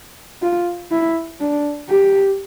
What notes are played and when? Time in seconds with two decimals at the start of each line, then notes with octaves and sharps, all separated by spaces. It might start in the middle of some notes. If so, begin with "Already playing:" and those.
0.42 F4
0.92 E4
1.40 D4
1.89 G4